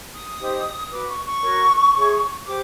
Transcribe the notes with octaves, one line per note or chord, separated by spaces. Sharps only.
D#6
D#4 G4 C5
F#4 B4 D6
C#6
C#6
F#4 A#4 C#5
E4 G#4 C#5
G4 C5 D6